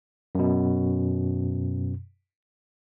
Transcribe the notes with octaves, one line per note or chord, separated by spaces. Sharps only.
F#2 B2